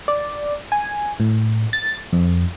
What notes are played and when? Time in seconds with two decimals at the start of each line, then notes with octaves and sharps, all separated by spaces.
0.08 D5
0.72 G#5
1.20 A2
1.73 A6
2.13 F2